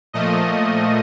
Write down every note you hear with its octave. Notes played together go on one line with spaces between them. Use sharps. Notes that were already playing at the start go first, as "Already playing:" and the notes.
A#2 F3 A3 D#5